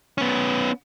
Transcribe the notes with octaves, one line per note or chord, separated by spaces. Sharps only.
B3 C#4